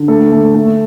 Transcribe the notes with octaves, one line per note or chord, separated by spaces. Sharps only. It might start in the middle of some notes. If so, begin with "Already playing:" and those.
Already playing: D3
A3 A4
A3
A3